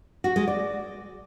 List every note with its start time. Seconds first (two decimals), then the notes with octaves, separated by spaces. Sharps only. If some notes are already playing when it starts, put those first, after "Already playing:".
0.24 F#4
0.36 G#3
0.48 D5